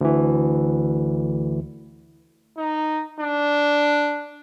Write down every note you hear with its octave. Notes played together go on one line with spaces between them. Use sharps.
D2 E3
D#4
D4